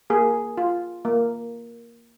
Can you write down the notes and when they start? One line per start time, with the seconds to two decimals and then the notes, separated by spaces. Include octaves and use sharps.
0.10 A#3 G#4
0.57 F4
1.05 A#3